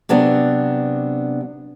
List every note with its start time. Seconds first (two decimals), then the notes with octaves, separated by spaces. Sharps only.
0.09 C3 F#3 B3 D4